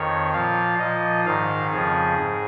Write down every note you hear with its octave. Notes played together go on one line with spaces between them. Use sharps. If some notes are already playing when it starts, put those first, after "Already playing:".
Already playing: F2 D#3 C#5
A#2 F3 F5
A#2 D#5
F3
G#2 D#3 F5
F2 C#3 F3 G#4
G#2